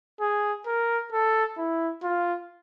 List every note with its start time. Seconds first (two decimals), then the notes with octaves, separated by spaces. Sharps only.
0.20 G#4
0.66 A#4
1.12 A4
1.58 E4
2.03 F4